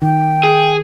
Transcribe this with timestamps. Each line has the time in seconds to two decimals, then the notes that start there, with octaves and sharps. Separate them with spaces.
0.02 D#3 G5
0.43 G#4